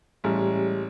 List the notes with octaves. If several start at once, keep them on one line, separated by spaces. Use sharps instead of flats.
A1 G3 G#3